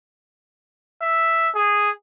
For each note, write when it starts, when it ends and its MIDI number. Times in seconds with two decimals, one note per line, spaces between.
1.02 1.49 76
1.55 1.90 68